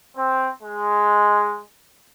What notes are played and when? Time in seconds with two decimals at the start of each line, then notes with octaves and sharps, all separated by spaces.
0.17 C4
0.62 G#3